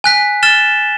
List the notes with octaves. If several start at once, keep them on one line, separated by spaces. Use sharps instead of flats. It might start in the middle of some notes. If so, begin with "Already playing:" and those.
G#5 F#6 B6
F6 A6 E7 G7